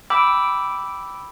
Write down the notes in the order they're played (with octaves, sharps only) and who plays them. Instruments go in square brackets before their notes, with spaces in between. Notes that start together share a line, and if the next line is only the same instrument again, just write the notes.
[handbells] G5 B5 D6 E6